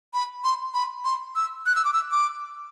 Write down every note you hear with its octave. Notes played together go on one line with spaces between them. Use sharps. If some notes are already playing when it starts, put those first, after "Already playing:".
B5
C6
B5
C6
E6
F#6
E6
D6
E6
D6